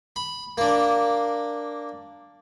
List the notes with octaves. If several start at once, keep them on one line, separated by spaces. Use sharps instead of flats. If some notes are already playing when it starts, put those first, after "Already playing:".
B5
A#3 D4